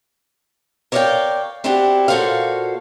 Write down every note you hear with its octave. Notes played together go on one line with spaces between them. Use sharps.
A#4 C#5 D5 E5 F5 G5
C4 D4 E4 F#4 G4
A#2 F#4 A4 C5 C#5 F5